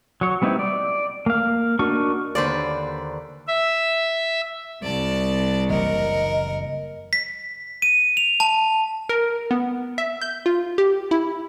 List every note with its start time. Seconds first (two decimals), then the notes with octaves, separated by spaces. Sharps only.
0.21 F#3 C#5
0.42 G3 B3 C4 D#4 E4
0.59 D5
1.26 A#3 F5
1.79 D4 D#4 F#4 A#4 C#6
2.35 D#2 D3 B4 C5 D5
3.48 E5
4.83 C2 D5 A5
5.69 F#1 E3 A#3 A#4 D#5 F#5
7.13 B6
7.82 D#7
8.17 F7
8.40 A5
9.09 A#4
9.51 B3
9.98 E5
10.22 G6
10.46 F4
10.78 G4
11.11 E4